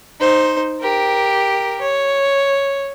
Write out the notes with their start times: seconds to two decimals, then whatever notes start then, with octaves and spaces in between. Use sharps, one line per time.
0.21 D#4 C5
0.80 G4 A#4
1.81 C#5